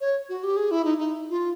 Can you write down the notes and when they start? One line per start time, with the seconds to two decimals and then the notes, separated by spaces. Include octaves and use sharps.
0.01 C#5
0.29 F#4
0.43 G4
0.57 G#4
0.71 E4
0.85 D#4
0.98 D#4
1.30 F4